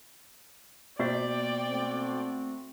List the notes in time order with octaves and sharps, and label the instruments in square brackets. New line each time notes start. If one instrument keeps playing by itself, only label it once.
[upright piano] B2 C5 A6 [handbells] A#3 B3 F4 [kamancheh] D5 G5
[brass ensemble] A3 C4 F#4